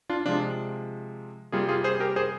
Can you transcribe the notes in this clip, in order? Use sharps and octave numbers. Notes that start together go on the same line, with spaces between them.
D4 F4
C3 F3 G#3 D4 F4
C3 G3 A#3 F4 G#4
F4 G#4
G#4 C5
G4 A#4
G#4 C5